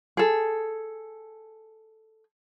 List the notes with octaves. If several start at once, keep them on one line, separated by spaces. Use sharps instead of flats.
G#4 A4